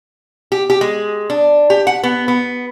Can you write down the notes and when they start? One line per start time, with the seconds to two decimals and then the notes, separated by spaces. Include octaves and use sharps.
0.52 G4
0.70 G4
0.81 G#3
1.30 D4
1.70 G4
1.87 F#5
2.03 B3
2.28 B3